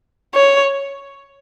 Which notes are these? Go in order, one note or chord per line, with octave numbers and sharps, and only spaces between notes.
C#5